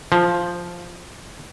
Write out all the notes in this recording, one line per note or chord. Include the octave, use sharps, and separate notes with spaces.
F3